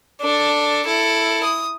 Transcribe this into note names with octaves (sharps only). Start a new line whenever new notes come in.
D4 A4
E4 A4
D#6